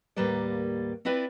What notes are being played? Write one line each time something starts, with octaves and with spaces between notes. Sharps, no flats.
D#2 A2 G3 A#3 B4 D5
C4 E4 F4 B4 D5